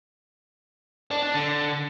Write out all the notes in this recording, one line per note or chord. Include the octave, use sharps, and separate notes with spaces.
D4
D4
D3